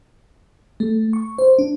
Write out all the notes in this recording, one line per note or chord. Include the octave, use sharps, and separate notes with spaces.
A3
C#6
C5
D4